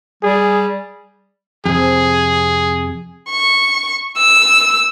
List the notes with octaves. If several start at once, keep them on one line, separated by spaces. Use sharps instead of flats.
G3 G#4
F2 C3 G#4
C#6
E6